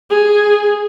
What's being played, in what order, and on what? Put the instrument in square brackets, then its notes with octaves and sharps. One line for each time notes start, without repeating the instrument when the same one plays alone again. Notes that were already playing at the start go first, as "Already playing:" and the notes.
[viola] G#4